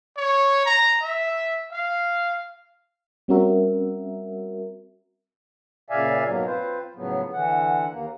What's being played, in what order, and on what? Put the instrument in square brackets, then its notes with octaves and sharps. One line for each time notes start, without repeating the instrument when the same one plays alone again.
[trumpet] C#5
A#5
E5
F5
[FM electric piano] G3 C4 C#4 F#4 A#4 E5
[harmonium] A#2 C#3 D5 E5 F5 G#5
G#2 B2 F#3 A#3
C4 F4 B4 C5
A2 C#3 F3 F#3 B3
D3 E3 F#5
D#2 A#3